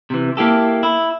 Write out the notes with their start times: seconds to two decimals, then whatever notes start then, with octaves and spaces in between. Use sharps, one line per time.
0.10 C3 E3
0.37 A#3 E4 G4 A4
0.83 E4